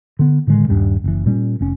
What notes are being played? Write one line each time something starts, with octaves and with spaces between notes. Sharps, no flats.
D3 B3
A2 D3 D#3 G#3
D#1 G2 G3 D4
F#1 E3
A#2 G3 C#4
F1 C#4